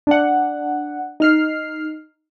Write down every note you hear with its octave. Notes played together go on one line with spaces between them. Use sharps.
D4 F#5
D#4 F6 C7